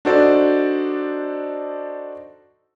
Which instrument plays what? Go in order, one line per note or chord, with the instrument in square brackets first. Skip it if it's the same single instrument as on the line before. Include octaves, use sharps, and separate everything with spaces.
[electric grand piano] D4 D#4 F#4 A4 C5 D5